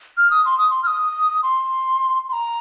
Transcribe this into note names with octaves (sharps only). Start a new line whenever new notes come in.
F6
D#6
C6
D#6
C6
F6
D#6
C6
C6
A#5